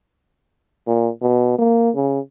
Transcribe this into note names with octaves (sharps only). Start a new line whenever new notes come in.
A#2
B2
A#3
C#3